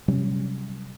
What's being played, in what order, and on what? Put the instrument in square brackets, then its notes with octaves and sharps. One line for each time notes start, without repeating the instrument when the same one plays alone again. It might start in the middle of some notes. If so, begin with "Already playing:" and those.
[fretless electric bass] C3 F#3 G3 C#4